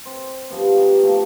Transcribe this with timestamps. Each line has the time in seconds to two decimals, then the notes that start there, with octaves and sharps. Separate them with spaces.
0.05 C4 C5
0.50 D3 F3 G3 B3
0.76 B3 D#4 G4 B4
1.03 A#2 C#3 F3 A3